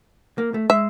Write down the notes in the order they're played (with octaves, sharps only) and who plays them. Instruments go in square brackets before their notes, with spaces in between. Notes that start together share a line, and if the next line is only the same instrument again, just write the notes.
[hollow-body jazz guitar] A#3
A3
[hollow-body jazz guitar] G#3 [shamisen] E5